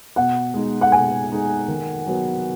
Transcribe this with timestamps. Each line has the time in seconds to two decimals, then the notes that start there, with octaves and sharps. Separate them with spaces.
0.16 B2 F#5
0.54 G#3 D#4 G#4
0.81 F#5
0.92 B2 G#5
1.31 G#3 D#4 G#4
1.68 D#3
2.07 F#3 B3 F#4 B4